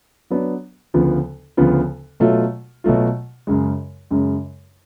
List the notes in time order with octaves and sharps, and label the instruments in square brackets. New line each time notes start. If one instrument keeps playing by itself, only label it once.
[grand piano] F#3 B3 D4
D2 C#3 F3 B3 F4
D2 C#3 F3 B3 F4
B2 F#3 A3 F4
B2 F#3 A3 F4
F#2 C#3 G#3
F#2 C#3 G#3